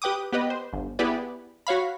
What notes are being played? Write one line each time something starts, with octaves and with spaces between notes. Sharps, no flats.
G4 B4 G5 D6 D#6
B3 G4 B4 D#5
C5
G1
B3 E4 G4 G#4 B4 D5
F#4 C#5 F5 B5